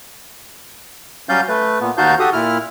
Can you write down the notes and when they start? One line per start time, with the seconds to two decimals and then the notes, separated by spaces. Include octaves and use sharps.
1.29 F#3 G3 C#4 D5 F5 G6
1.48 A3 B4
1.81 A#2 B3
1.98 D#2 D#4 F#4 F5 A5 G6
2.20 F#4 G4 A4 D#6
2.33 A#2 E4 F6